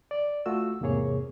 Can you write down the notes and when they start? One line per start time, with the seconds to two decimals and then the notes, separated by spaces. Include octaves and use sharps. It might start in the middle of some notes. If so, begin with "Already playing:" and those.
0.11 D5
0.46 A3 F4 F#4 E6
0.81 E2 G#2 C3 A#3 G#4 C#5